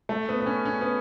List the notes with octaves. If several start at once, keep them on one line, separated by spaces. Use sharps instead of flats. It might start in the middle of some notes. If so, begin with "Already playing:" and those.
A3
B3
B3
C#4
C#4
B3